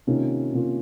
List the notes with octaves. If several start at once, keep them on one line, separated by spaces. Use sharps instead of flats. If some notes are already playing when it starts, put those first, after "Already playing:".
C3 D#3 A#3 C#4 F4
C3 D#3 A#3 C#4 F4